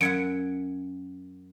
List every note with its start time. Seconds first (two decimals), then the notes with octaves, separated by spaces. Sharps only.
0.01 F#2 E5 F#5 G#6 C#7 D7